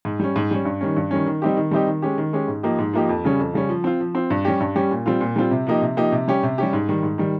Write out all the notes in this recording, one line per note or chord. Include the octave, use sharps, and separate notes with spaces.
G#2
G3 C#4
G#2
G3 C#4
G2
D#3 G3 C#4
G2
D#3 G3 C#4
D#3
G3 C4 D#4 G4
D#3
G3 C4 D#4 G4
D#3
G#3 C#4 G4
D#3
G#3 C#4 G4
G#2
F3 A#3 D#4 G4
G#2
F3 A#3 D#4 G4
F2
C#3 G3 C#4
F2
C#3 G3 C#4
F3
C4 F4
F3
C4 F4
G2
G3 C#4 G4
G2
G3 C#4 G4
A#2
G3 C4 F4
A#2
G3 C4 F4
C3
F3 A#3 D#4 G4
C3
F3 A#3 D#4 G4
C3
G3 C#4 G4
C3
G3 C#4 G4
G#2
D#3 G3
G#2
D#3 G3